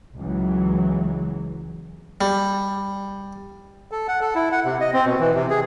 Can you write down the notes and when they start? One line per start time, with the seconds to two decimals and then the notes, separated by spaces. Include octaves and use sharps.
0.17 C#2 E3 F#3
2.21 G3
3.92 A4
4.08 F#5
4.21 A4
4.35 E4
4.52 F#5
4.65 C3
4.81 D#5
4.93 C4
5.06 B2
5.20 E3
5.35 C3
5.50 G#4